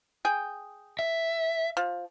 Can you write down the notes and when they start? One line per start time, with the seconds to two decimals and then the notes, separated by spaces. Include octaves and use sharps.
0.25 G#4 G5
0.99 E5
1.77 F3